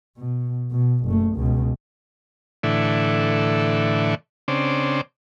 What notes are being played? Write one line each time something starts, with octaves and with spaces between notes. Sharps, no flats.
B2
B2
F#1 A3
C#2 B2
A2 D3 E3
C#3 C4 D4